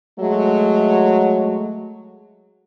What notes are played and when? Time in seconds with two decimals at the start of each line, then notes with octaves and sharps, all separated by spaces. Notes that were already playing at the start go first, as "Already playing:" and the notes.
0.19 F#3 G#3 A3